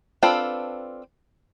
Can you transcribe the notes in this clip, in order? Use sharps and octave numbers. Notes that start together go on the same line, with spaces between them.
C4 D4 F4 A4 B4